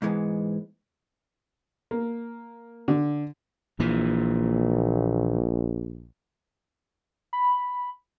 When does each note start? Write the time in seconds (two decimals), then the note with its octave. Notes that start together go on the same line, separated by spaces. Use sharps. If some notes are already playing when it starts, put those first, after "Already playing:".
0.02 G#2 E3 G#3 B3
1.91 A#3
2.88 D3
3.80 A#1 A#2 E3
7.33 B5